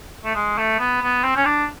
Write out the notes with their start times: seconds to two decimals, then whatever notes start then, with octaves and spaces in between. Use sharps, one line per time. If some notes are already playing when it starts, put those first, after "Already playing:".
0.24 A3
0.35 G#3
0.58 A3
0.79 B3
1.02 B3
1.24 C4
1.36 C#4
1.45 D4